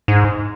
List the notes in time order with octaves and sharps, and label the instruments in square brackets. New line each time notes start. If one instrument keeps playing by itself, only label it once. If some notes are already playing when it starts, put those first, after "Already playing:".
[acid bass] G#2